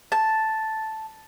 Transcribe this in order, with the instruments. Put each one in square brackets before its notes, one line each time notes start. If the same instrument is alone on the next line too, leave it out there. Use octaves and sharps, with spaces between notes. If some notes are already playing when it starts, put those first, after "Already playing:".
[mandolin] A5